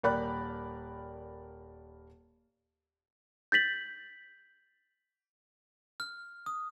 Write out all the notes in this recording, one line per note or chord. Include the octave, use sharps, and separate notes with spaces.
D#1 A#4 D5 G5 B5 F#6
G6 A6 B6 F#7
F6
D#6